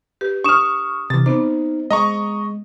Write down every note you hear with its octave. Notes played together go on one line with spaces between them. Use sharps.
G4 B4
D4 C#6 D#6 F6 E7
C3 E3 A6
B3 C4 D#4 C5 D6
G#3 D#5 A#5 C#6